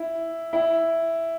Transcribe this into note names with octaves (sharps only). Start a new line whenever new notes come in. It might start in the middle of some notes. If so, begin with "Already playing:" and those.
Already playing: E4
E4